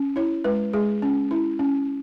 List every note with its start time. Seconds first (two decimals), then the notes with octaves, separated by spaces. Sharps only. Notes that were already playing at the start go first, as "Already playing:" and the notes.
Already playing: C#4
0.16 E4 C#5
0.44 G#3 B4
0.73 G#3 G#4
1.02 C#4
1.31 E4
1.59 C#4